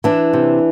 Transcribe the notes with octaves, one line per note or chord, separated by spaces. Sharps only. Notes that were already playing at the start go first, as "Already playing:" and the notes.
E3 D4
C3